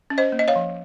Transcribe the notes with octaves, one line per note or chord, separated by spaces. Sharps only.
C#4
C5 D#5
A#3
D#5
C#5 F5
F3